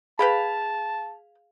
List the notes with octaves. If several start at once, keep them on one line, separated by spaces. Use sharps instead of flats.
G#4 B4 F5 G5 A5 B5